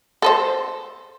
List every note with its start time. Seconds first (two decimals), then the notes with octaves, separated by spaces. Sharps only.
0.22 A4 B4 C5